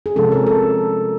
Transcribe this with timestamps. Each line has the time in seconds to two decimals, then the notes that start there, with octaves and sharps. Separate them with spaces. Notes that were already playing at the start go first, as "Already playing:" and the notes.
0.06 G#4
0.16 C3 F3 G#3 C#4 A4
0.32 A#4
0.47 A4